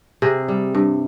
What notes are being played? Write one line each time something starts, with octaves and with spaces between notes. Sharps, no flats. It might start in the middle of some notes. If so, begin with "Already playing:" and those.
C3 G#4
G3
G2